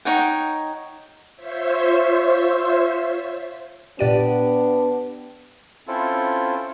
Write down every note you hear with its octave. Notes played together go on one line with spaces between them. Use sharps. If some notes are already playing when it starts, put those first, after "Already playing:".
D#4 C#5 F#5 G5
F4 C5 C#5 E5
A#2 B3 D4 G4 D5 F#5 D#7
C4 C#4 E4 F4 A4